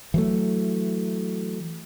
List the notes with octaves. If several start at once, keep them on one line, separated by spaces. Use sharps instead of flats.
E3 F#3 A3